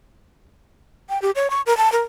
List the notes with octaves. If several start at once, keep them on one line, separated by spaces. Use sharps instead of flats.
G5
G4
C#5
C#6
A#4
A5
A#4